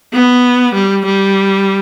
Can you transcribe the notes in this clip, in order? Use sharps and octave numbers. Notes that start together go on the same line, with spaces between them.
B3
G3
G3